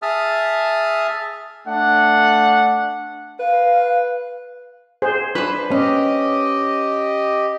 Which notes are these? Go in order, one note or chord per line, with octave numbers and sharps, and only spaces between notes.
G#4 E5 A5 D#6 F6
A3 D4 F#5
B4 F5
G#4 C5
D4 B4 C5
C#4 G4 D#5